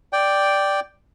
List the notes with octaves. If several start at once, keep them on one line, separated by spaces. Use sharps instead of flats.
D5 G5